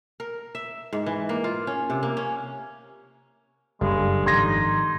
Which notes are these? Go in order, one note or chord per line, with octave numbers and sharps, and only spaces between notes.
A#4
E5
G#2
E3
A#3
F4
C#4
C3
A#3
C#4
F#1 G2 G#3 A4
G#1 F3 D#4 C6 G#6 A#6